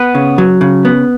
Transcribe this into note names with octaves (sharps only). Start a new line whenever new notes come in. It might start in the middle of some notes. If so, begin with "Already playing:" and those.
Already playing: B3 B4
C#3
F#3
C#3
B3